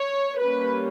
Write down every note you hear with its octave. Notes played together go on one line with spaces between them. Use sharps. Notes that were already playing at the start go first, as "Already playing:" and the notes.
Already playing: C#5
G3 A#3 C#4 B4